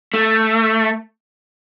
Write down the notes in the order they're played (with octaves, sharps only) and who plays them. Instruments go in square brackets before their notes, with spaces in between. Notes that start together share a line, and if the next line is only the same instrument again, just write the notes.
[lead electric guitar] A3